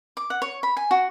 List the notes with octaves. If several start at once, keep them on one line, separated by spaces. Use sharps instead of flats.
D6
F#5
C#5
B5
G#5
F#4